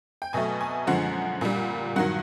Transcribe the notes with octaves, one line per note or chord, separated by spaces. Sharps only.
G5
B2 F#3 A3 G#5
G#5
F#2 D3 F3 G#3 F#5
A#2 G3
G2 D#3 F#3 F#5